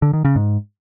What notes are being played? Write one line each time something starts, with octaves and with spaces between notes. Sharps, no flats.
D3
D#3
C#3
G#2